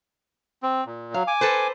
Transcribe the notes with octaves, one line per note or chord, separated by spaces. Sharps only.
C4
A#2
F#3 F5
G#5 D6
A4 B4 C5